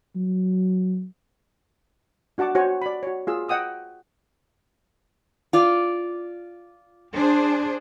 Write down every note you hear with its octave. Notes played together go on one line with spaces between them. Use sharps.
F#3
D4 F#4 F#5 A5 D6
F#4 C5 C#5 G#5 C#6
D5 B5
F#4 C#5
F4 G#4 E6
D#5 F#5 G5 D#6 E6
F4 D5
D4 G#4 C5